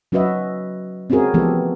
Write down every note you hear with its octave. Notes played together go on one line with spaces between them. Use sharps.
F#3 C#4 F#4 B4 D#5 E5
C4 C#4 E4 F#4 G#4 A#4
E3 F3 A3 B3 G4 A4